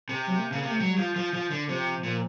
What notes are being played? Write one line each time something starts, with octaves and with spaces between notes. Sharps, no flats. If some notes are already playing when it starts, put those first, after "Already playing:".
C3
F#3
A#3
C#3 A#3
C3 A#3
A3
F#3 G#3
G3
F3
F3
F3
D3
C3 F3
A#2